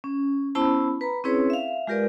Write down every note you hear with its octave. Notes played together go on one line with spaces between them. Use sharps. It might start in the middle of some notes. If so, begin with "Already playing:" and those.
C#4
B3 C#4 E4 C5 A5 B5
B4 A#5 B5
C4 C#4 E4 G#4 B4 C#5
E5 F5
G#3 F4 G4 A#4 B4 D5